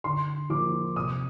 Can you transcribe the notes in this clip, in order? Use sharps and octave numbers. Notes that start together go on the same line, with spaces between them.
D3 C6
F3 A#3 D6
C3 D#6